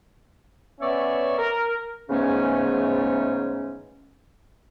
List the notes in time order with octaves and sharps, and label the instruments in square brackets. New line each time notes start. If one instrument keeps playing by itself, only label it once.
[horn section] B3 C#4 C#5 D5 E5
A#4
[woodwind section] G#2 C#3 E3 A3 B3 C#4